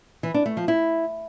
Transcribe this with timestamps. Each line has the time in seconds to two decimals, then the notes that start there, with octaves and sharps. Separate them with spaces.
0.23 E3
0.34 D4
0.46 A3
0.57 F3
0.68 E4